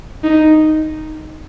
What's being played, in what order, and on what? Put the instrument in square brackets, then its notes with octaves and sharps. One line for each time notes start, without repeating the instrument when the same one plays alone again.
[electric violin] D#4